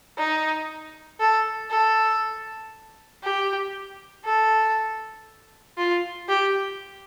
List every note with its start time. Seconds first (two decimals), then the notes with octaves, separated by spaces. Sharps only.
0.18 D#4
1.20 A4
1.71 A4
3.23 G4
4.25 A4
5.78 F4
6.29 G4